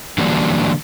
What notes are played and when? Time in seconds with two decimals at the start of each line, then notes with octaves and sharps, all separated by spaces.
0.18 D3 E3 F#3 G3 A#3 D4